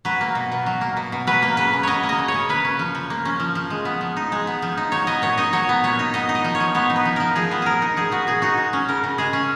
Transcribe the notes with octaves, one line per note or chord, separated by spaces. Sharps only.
F#3 B4
A#3
B2
B2
F#3
A#3
B2
B2
F#3 B4
A#3
C#3 B4
C#3
F#3 C#5 D#5
A#3
D#5
C#3
C#5
C#3
A#3 B4
C#4
F3
F3
A#3
C#4
F3
F3
G#3
B3
F3
D#4
G#3
B3
F3
D#4
F#3 C#5
B3 D#5
A#2 C#5
D#4 D#5
F#3 C#5
B3
A#2 C#5
D#4
B3 D#5
D#4
D#5
F3
C#5
F3
B3 C#5
D#4
B4
F3
F3 A#4
F3 G#4
B3
A#2 G#4 A#4
D#4
F3 G#4
B3 F#4
A#2 G#4
D#4 F#4
G#3
C#4
C#3 A#4
C#3
G#3 G#4
C#4